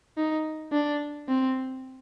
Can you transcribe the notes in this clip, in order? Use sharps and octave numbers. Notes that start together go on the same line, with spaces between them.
D#4
D4
C4